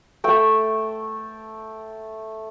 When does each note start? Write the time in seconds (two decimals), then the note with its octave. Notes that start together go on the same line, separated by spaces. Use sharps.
0.24 A3 G5 E6